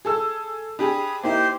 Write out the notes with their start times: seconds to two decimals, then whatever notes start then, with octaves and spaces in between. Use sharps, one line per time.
0.05 G#4 A4 E6
0.79 D4 G4 G#4 B5 D#6
1.23 A#3 D#4 E4 G4 C5